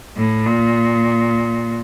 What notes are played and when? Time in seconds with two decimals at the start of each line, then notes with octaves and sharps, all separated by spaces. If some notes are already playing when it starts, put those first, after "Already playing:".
0.17 A2
0.47 A#2